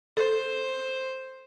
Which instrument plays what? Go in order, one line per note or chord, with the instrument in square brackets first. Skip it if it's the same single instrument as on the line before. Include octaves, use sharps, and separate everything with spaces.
[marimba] A4 [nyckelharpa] C5